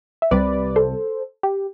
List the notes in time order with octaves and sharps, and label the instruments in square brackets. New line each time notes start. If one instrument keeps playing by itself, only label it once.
[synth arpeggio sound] E5
C2 C3 G3 B4 D5
A4 C5
G4